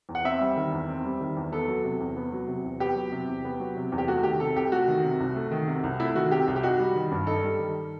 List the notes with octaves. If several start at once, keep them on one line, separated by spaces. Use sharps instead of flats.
E2
F#5
C4 E5
G3
D#3
E2
C4
G3
D#3
E2
B3 A4
F#3
C3
E2
B3
F#3
C3
E2
B3 G4
F#3
C3
E2
B3
F#3
C3
E2
G4
A3 F#4
D#3 G4
C3 A4
C2 G4
A3 F#4
D#3
C3
C2
A3
D#3
C3
C2
A3 E4
D#3 F#4
C3 G4
C2
G4
D#4 F#4
G3
D#3
G2
D#4 A4
G3
D#3